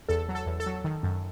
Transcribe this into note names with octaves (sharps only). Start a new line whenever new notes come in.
E2 A4
F#3
A4
E2
A4
F#3
D#3
F#2